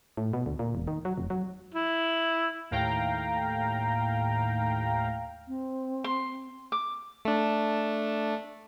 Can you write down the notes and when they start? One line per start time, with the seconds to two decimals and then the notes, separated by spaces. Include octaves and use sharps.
0.17 A2
0.33 B2
0.46 D2
0.59 A#2
0.75 E1
0.87 D#3
1.05 F#3
1.18 F1
1.30 F#3
1.74 E4
2.71 D#2 A2 F5 G5 A#5
5.48 C4
6.04 C6
6.72 D6
7.25 A3 D4